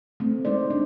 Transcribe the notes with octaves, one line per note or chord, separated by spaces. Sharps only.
A3 C4
G#3 D#4 C5 D5
D4